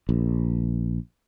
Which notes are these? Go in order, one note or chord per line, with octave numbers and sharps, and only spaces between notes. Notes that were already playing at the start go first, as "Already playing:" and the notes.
A#1